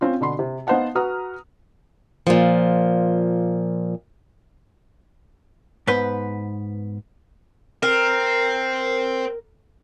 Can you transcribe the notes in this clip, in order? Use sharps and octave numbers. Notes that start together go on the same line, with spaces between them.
C4 C#4 F4
B2 D3 B5 C6
C3
B3 D#4 C5 F5 F#5 A5
F#4 B4 F#5 A#5 D#6 F6
A#2 F3
G#2 B3 B4 C5
C4 A#4